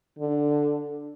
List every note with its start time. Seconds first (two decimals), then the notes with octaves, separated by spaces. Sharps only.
0.19 D3